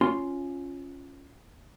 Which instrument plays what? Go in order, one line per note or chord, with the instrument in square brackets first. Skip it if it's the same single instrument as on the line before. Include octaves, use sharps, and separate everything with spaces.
[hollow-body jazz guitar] C#4 F4 C6